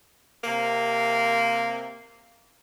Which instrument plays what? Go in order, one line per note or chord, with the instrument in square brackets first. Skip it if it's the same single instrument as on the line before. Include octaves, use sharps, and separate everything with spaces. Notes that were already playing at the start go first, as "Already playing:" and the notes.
[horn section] C3 A#3